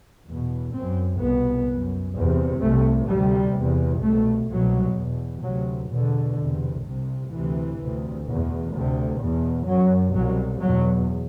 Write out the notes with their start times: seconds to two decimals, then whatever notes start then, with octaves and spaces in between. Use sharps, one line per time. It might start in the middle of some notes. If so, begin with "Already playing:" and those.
0.27 E2 B2
0.75 F#2 C4
1.21 C2 B2 B3
1.69 F#2
2.16 E2 C3
2.62 C2 C3 A3
3.09 D2 C3 G3
3.57 E2 C3
4.03 C2 B2 A3
4.50 C2 B2 F#3
4.97 E2 B2
5.44 D2 C3 F#3
5.91 E2 B2 D3
6.38 E2 C3
6.84 C2 C3
7.31 D2 C3 E3
7.79 D2 C3
8.26 E2 B2
8.73 D2 C3
9.19 E2 B2
9.66 F#2 F#3
10.13 C2 B2 F#3
10.60 E2 B2 F#3